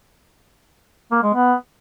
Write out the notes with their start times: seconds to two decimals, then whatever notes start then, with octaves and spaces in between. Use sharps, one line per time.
1.12 A#3
1.23 G#3
1.34 B3